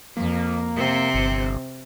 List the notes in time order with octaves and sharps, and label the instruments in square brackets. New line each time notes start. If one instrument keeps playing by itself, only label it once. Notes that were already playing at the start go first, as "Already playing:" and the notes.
[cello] F2 [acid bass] A#3
[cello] C3 C4
[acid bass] G1